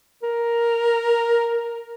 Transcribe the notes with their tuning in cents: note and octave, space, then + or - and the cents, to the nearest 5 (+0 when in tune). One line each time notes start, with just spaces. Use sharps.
A#4 +5